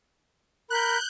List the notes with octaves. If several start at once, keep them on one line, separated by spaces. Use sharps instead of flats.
A#4 B5 F#6 G6